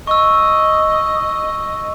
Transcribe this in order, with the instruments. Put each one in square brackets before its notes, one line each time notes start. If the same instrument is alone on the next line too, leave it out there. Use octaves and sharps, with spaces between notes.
[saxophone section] D#5 [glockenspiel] C#6 E6